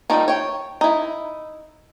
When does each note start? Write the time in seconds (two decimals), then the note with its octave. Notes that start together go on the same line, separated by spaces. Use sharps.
0.10 D#3 F3 G3 D#4
0.28 C#5 G5
0.81 D#4 E4